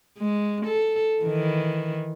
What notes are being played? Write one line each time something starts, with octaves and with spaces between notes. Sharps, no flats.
G#3
A4
D#3 E3